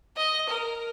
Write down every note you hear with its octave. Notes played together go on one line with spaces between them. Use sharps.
D#5
A#4